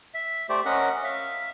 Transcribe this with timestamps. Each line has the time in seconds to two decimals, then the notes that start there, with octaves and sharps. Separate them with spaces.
0.14 E5
0.49 A3 G4 C5 D5
0.65 C#4 A#4 D#5 F#5
1.04 E5 F5